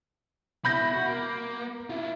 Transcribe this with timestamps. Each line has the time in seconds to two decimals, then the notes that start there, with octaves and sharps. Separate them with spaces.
0.65 B2 E4 B5 G6 A#6
0.93 F#4
1.06 A#3
1.90 E4 F4